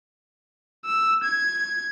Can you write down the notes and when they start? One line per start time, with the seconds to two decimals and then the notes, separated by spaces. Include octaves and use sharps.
0.85 E6
1.24 G#6